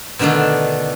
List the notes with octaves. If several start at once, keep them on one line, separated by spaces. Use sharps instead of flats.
B2 D3 D#3 A3 D4